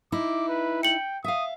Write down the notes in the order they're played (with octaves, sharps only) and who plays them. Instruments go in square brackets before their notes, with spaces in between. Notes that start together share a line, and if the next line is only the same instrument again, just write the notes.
[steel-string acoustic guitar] D#4 E4 [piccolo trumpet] D6
[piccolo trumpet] B4
[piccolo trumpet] G5 [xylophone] C#7 F#7
[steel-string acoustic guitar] E5 F5 [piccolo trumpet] D#6